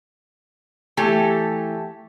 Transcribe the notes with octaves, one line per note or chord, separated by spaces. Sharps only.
E3 A3 G4 A4